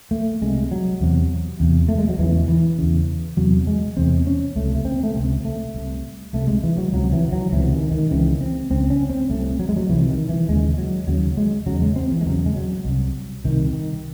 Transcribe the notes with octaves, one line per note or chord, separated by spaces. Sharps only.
A3
C2 C3 G#3
F#3
E2 C3
E2 C3
A3
G#3
F#3
E2 C#3 E3
E3
E2 C#3
E2 C3 F#3
G#3
E2 C3 C4
C#4
C#2 C3 A3
A3
C4
A3
C#2 C3 C4
A3
C2 C3
C2 C3 A3
G#3
E3
F#3
C#2 C3 F#3
E3
E3
F#3
C#2 C3 E3
D#3
D#3
C#2 C#3 E3
C4
C#2 C#3 C4
C#4
C4
C2 C3 A3
F#3
G#3
F#3
C2 C3 E3
D#3
E3
D#2 C#3 G#3
F#3
D#2 C#3 F#3
G#3
E2 C#3 F#3
G#3
C4
E3
G#3
E2 C#3 F#3
G#3
F#3
C2 C3
C2 C3 D#3
D#3